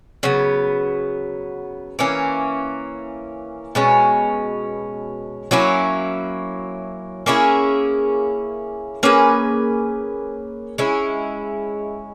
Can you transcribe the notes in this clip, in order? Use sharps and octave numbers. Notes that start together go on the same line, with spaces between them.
C#3 F#3 B3
E3 A#3 C#4
B2 G#3 C#4
F#3 A#3 C#4 E4
A#3 C#4 E4 G#4
A#3 C#4 G#4 B4
G#3 C#4 E4